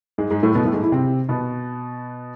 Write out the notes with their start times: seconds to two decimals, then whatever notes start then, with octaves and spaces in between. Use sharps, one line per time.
0.18 G#2 G#3
0.30 G#2 G#3
0.43 A2 A3
0.55 B2 B3
0.65 A2 A3
0.73 G#2 G#3
0.83 E3 E4
0.92 C3 C4
1.29 B2 B3